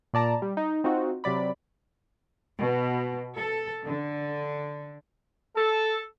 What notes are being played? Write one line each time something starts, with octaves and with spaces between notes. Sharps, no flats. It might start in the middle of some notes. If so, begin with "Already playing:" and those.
A#2 D5 A5 A#5
G3
D#4
C4 D#4 F4 F#4
C3 F#3 D5 B5
B2
A4
D3
A4